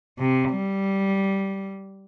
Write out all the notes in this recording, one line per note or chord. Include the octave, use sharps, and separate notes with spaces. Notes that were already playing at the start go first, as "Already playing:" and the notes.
C3
G3